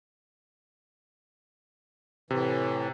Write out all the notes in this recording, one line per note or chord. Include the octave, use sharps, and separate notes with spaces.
A2 C3 E3